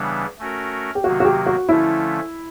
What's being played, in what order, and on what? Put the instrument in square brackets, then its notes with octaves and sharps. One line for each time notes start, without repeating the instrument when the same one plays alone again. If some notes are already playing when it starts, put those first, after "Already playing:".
Already playing: [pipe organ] C#3 E3 G3 B3 D4
A3 C#4 F#4 A#4
[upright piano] G4
[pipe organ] C3 D#3 F#3 A#3 [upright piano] F#4
[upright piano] F#4
G4
F#4
[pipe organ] D3 F3 A3 C#4 [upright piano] E4